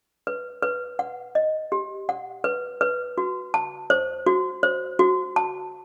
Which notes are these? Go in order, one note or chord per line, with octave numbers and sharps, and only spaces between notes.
B4
B4
F#5
D#5
G4
F#5
B4
B4
F#4
A5
C5
F#4
C5
F#4
A5